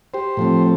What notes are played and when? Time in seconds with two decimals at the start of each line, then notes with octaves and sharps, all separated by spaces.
0.14 G4 C5
0.37 A2 F3 A3 C4